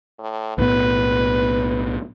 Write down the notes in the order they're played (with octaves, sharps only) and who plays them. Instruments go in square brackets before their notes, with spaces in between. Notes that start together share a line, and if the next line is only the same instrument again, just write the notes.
[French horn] A2
[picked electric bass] B1 A2 B3 [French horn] B4